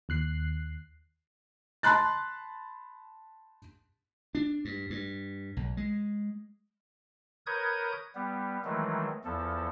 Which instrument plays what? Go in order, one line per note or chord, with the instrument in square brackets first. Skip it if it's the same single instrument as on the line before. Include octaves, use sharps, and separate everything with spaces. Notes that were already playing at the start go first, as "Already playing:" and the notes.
[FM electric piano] D#2 F#6 C7
[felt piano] A5 B5 C6 F#6 A6
[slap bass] D4
G2
G2
B1
G#3
[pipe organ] A#4 B4 C#5 D#6 G6 G#6
G3 B3
D#3 E3 F#3 G#3 A3
E2 F3 A4